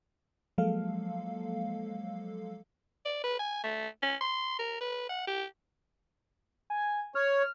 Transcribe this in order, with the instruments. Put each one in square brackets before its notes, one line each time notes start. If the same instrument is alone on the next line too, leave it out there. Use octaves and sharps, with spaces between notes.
[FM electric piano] F3 F#3 G#3 A#3 A4 F5
[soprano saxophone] D5
B4
G#5
A3
C#4
C6
A#4
B4
F#5
G4
[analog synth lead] G#5
[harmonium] C#5 [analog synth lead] F6